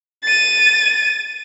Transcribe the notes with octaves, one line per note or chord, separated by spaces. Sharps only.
A6 D#7